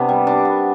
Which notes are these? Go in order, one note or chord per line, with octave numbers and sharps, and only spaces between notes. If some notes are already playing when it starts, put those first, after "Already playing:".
Already playing: C3 B3 D4
G3
D4
B3